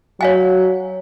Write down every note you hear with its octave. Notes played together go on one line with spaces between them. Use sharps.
F#3 C#5 F5 G#5